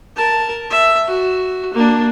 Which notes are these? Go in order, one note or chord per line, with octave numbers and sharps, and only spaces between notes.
A#4 A5
E5
F#4
A#3 D4